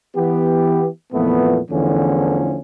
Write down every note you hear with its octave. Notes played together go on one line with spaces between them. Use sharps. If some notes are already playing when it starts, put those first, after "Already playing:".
E3 B3 G4
F2 A#2 E3 A3 B3
E2 D3 E3 F3 A3 C#4